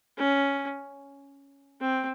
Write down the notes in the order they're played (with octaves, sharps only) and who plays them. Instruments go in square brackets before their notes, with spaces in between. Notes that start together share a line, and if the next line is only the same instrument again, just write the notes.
[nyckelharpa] C#4
C4